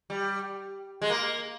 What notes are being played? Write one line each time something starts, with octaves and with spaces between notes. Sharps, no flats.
G3
G#3
A#3